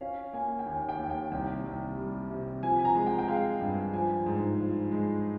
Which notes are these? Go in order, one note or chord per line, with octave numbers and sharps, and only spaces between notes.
C#4 F5
A#3 G#5
G5
D#2 G#5
G5
D#2
G5
C2 G5
C2
G3
C3
F3 G#5
G#5
A#5
G#3
G5
G5
G#3 F5
G2
F3 G#5
G#2
F3
G#3